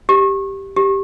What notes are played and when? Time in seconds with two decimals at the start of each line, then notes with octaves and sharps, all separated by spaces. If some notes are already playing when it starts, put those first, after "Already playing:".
0.09 G4
0.76 G4